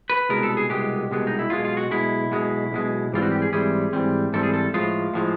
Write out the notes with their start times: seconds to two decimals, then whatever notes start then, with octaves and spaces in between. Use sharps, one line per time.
0.10 B4
0.29 C2 B2 G#3 B3 A#4
0.43 A4
0.57 G#4
0.70 C2 B2 G#3 B3 G4
1.11 C2 B2 G#3 B3
1.27 D#4
1.39 E4
1.50 B1 B2 G#3 F4
1.65 F4
1.77 F#4
1.91 B1 B2 G#3 E4
2.31 B1 B2 G#3
2.72 B1 B2 G#3
3.12 G#2 E3 G3 C4 F4
3.22 F#4
3.32 G4
3.42 G#4
3.52 G#2 E3 G3 C4 G#4
3.93 G#2 E3 G3 C4
4.33 G#2 E3 G3 C4 A4
4.43 G#4
4.54 A4
4.74 A2 F3 G#3 F4
5.14 A2 F3 G#3